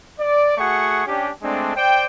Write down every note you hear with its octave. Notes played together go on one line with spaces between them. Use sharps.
D5
A3 F#4 G#4 F#5 C#6
C#4 D4 G4
G#3 A3 C4 D4
C5 D5 G5